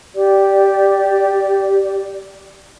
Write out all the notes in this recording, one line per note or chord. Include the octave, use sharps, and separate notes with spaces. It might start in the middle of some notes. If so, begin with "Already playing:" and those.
G4 D5